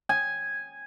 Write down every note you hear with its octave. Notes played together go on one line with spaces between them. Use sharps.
G#5